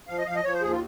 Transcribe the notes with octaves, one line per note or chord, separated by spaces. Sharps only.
F3 F5
D#5
F3 F5
D#5
F3 C#5
C5
D#2 G#4
F4